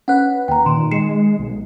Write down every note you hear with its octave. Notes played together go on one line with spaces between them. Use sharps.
C#4 B4 F#5 F#6
D#2 G5 A#5
A#2 D#3 C6
G#3 C7 C#7 E7
B1